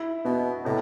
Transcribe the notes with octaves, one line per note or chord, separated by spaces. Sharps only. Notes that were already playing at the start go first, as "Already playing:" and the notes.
Already playing: E4
B2 B3
A2 C3